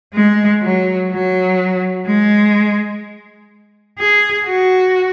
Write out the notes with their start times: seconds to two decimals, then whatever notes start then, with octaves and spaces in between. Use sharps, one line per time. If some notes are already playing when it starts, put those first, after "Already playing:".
0.14 G#3
0.62 F#3
1.11 F#3
2.06 G#3
3.99 G#4
4.46 F#4